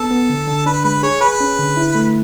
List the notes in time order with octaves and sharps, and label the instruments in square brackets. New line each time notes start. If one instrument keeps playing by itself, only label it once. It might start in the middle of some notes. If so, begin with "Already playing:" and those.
Already playing: [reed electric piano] B3 [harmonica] A4
[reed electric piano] B3
D3
D3
[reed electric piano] D4 [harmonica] B4
[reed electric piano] G#3 [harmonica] B4
[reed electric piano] G#4 [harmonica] C#5
[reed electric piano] G#4 [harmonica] B4
[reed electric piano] C#4
D3
E4
A3